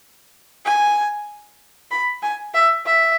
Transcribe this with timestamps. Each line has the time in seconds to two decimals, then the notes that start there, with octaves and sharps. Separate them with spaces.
0.65 G#5
1.91 B5
2.22 G#5
2.54 E5
2.86 E5